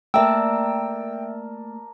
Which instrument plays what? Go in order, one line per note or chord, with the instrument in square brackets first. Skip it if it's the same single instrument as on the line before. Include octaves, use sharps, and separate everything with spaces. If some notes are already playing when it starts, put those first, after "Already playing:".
[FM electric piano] A3 A#3 [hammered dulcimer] A#4 D5 A5 [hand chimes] E5 E6 [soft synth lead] G5